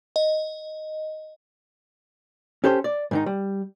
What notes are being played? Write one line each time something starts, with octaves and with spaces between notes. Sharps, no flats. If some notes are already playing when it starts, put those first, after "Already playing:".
D#5
C#4 G4 A4 C5
D5
G#2 D#3 D#4
G3